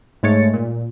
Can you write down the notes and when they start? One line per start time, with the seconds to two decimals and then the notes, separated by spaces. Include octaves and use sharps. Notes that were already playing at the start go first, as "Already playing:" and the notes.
0.23 G#2 G#3 A3 C#5 A6 C#7
0.54 A#2